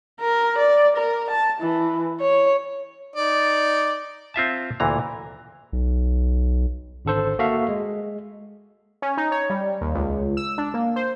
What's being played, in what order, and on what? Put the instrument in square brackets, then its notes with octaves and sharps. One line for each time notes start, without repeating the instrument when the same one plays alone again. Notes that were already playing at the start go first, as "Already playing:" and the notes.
[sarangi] A#4
D5
A#4
A5
E3
C#5
[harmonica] D#4 D5
[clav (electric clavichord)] C4 F4 E5 A5
D2 A#2 E3 A#5
[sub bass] B1
[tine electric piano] G#1 D3 A4 C5
A#3 F#4 A4 E5 F5
G#3
[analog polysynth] C#4
D#4
C#5
G3
D#2
C#2
E6
D4
A#3
C5